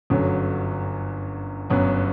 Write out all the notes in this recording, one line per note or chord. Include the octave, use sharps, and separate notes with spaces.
G1 F#2 D3 F#3
G1 F#2 F#3 B3